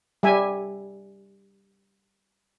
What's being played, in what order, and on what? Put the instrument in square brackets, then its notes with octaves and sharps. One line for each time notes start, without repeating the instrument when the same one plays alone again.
[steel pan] G3 E5 G#5